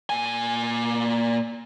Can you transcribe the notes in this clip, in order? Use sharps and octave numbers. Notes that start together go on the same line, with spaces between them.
A#2 G#5